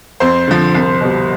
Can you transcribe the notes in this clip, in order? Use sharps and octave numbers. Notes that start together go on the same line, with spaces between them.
F2 C5 C6
D3 F3
C2
B2 G3